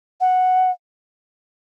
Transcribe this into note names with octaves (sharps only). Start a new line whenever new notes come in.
F#5